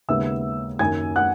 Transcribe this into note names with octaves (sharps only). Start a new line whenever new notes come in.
D#2 C#3 G#3 B3 E5 E6
F#2 D#3 A#3 G#5 G#6
F#5 F#6